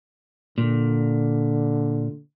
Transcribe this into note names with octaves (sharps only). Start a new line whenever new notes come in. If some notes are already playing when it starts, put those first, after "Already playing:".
A#2 D3